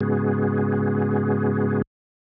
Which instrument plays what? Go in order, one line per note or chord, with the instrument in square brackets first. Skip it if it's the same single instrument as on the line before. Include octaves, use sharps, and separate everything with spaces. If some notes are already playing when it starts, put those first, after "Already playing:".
[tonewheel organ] G#2 C#3 G#3 B3 F#4 G#4